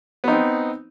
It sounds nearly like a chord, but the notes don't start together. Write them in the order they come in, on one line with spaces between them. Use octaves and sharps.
B3 D#4 C4